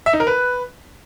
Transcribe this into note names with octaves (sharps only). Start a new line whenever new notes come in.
E5
D#4
A#4
B4